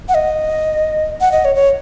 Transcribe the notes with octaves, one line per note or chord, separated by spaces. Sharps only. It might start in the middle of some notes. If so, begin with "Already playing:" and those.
F#5
D#5
F#5
D#5
C#5
C#5